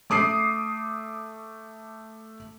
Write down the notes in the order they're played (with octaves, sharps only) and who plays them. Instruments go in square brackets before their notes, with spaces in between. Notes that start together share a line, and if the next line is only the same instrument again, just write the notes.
[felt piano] A3 D6 D#6 C7